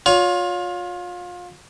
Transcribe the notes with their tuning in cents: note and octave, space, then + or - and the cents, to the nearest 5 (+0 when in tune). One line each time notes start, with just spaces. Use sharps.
F4 +30 C#5 +35